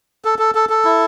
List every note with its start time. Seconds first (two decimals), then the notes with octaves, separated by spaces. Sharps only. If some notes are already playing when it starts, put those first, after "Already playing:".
0.25 A4
0.39 A4
0.55 A4
0.69 A4
0.85 E4